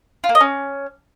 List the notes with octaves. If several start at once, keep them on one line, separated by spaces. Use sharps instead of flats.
F4
A#3
D#5
C#4